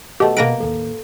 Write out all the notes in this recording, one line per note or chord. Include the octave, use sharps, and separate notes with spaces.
B2 A3 G4 D#5 F#5
B2 A#3 B3 A#4 B4 A#6 D7
A1 D#2 A4